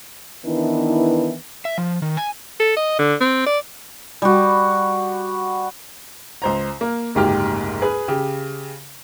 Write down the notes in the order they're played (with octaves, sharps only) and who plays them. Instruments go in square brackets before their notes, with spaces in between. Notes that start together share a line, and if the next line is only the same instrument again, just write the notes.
[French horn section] D#3 E3 B3 D4 E4 B4
[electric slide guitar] E5
F3
D#3
G#5
[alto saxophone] A4
D#5
D3
C4
D5
[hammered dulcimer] G3 F#4
[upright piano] C#2 C5 A#5
A#3
F#1 D2 G#2 A#3 G4 F6
G#4 B4
C#3 G4